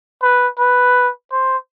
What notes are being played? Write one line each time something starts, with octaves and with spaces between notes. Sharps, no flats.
B4
B4
C5